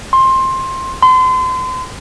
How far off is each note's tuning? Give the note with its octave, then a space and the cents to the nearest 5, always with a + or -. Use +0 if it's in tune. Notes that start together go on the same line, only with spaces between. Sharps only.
C6 +15
C6 -35